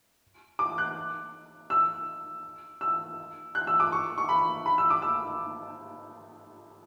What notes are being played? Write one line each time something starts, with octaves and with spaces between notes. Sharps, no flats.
D6
F#6
E6
E6
F#6
E6
D6
C#6
C#6
B5
B5
E6
D6
E6